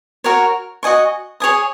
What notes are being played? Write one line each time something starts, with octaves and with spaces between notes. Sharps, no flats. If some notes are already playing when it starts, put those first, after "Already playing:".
F#4 A#4 C#5 F#5
F#4 D#5 G#5 C#6
G#4 C#5 G#5 D#6